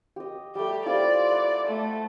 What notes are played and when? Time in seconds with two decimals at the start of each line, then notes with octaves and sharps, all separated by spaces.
0.16 G4 D#5
0.55 G3 A3 G4
0.86 E4 F4 C5 D5
1.32 F#5
1.68 A3